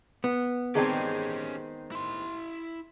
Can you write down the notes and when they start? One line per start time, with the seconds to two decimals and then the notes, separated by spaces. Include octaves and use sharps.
0.24 B3
0.75 D#3 G#3 C4 C#4 G4 G#4 D5 A5
1.92 E4 C6